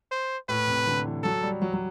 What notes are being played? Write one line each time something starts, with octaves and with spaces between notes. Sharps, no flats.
C5
A2 B4
C3
D3
E3
F#3 A4
G3
F#3
F#3